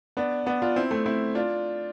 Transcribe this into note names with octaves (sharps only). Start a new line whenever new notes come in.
B3 D4
B3 D4
D4 F4
C4 E4
A3 C4
C4 E4
D4 F4